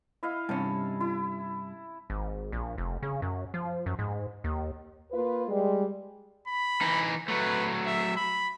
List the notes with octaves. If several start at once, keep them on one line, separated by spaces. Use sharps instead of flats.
E4 D#5 F5
G2 C3 C#4 A5
E4
G#1
A#1
F1
C#3
F#2
F3
F#2
G#2
D#2
A#3 F4 B4
G3 G#3
B5
E3 D#4
F#3 A3 B4
E5
B5